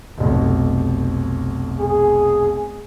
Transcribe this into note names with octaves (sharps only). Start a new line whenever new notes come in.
F1 B1
G#4